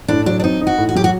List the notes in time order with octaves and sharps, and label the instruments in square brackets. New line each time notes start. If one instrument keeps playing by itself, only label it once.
[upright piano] A2 [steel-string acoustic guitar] D4
[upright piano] F#3 [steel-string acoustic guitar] D4
[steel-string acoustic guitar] D4
[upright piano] C4 [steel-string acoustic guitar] D#4
[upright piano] D#4
[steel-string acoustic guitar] F#4
[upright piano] A2
[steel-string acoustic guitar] F#4
[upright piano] F#3 [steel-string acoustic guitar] G4
[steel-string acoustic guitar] F#4